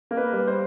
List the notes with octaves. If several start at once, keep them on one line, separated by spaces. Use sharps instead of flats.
A#3
B4
G3
C5